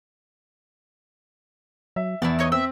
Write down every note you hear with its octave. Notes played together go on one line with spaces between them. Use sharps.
F#3 E5
E2 B3 E4 D5 A5
D#4 C#5 D#5
C4 E5